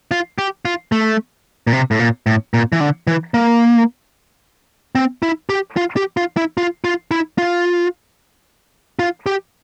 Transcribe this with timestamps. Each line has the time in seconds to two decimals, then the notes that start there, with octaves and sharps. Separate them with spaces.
0.11 F4
0.38 G4
0.65 F4
0.92 A3
1.67 A#2
1.73 C3
1.91 A2
1.99 A#2
2.27 A2
2.54 A#2
2.72 E3
2.80 D3
3.07 E3
3.34 A#3
4.95 C4
5.23 E4
5.49 G4
5.77 F4
5.97 G4
6.17 F4
6.37 E4
6.57 F4
6.84 F4
7.11 E4
7.38 F4
8.99 F4
9.26 G4